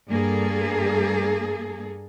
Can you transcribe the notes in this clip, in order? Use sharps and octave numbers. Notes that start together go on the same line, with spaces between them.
G2 A#3 G#4 A4